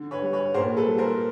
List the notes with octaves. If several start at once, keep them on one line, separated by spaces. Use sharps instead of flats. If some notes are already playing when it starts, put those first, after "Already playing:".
Already playing: D3
B4 C#5
G3
B4 C#5
A#2 A#4 C5
A4 B4
G3
A#4 C5